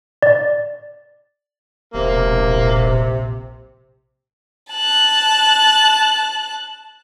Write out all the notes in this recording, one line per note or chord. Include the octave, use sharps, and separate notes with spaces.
D5
E1 A#1 C3 A#3
A5 F#6